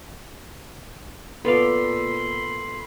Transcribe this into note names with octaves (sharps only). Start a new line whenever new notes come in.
A#2 B3 F4 A4 D5 F5 B5 C6